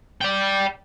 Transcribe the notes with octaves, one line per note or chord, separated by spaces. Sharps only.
D5 G5